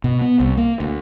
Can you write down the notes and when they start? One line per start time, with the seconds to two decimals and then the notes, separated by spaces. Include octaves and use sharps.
0.04 B2
0.21 B3
0.40 C2
0.57 A#3
0.80 D2